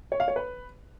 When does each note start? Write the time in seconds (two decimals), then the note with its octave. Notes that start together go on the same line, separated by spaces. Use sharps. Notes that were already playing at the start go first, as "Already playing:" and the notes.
0.12 C#5
0.20 F5
0.28 C#5
0.36 B4